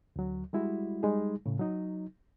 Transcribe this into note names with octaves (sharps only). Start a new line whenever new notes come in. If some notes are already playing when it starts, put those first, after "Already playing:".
D2 F#3
G3 G#3 E4 F#4
G3 G#3 D#4 G#4
A2 C#3
F#3 D#4